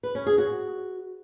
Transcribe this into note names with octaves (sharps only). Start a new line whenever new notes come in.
B4
C#4
G#4
F#4